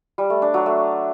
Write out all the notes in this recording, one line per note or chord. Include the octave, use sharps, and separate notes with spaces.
G3
A3
D4
F#3
A3